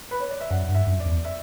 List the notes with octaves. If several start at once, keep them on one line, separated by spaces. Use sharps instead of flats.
B4
C#5
D5
E5
F#2 F#5
G2
E5
F#2
D5
E2
E5